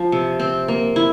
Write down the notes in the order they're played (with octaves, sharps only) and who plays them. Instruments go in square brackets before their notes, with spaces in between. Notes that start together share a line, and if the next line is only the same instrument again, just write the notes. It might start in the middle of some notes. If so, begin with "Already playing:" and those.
Already playing: [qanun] F3
C3
C4
A#3
E4